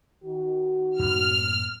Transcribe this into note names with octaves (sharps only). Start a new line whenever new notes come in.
D#3 F#4
F#2 A2 A#3 F6